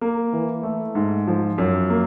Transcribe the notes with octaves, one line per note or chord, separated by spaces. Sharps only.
A#3
E3
A3
G#2
F3
F#2
A#3